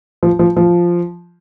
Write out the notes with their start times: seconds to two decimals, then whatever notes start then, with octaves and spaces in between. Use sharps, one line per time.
0.23 F3
0.39 F3
0.57 F3